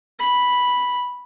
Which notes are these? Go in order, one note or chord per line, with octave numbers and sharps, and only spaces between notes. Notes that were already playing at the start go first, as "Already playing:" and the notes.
B5